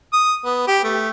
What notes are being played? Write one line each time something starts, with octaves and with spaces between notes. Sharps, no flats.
D#6
B3
G4
A3